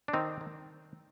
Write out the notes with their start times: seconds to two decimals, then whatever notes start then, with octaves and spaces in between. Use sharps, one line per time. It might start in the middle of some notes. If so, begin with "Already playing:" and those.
0.08 D4
0.13 D#3 C4 D#4
0.41 D#3